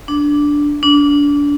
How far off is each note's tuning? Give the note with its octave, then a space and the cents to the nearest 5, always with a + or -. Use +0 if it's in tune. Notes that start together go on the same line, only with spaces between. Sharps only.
D4 -5
D4 -25